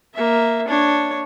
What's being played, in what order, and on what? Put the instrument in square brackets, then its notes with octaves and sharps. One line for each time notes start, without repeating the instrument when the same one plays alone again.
[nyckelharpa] A#3 E5
D4 C#5